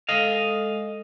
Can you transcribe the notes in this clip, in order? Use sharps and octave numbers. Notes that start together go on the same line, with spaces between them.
G#3 A4 D#5 F5